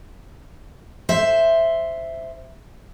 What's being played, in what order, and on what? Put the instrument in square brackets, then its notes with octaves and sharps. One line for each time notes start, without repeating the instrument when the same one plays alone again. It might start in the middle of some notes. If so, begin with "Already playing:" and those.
[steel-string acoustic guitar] C5 E5